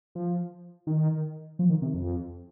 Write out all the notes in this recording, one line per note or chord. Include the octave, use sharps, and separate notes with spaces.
F3
D#3
F3
D#3
C3
F2